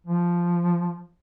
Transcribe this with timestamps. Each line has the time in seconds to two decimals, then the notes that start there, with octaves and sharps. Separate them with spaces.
0.06 F3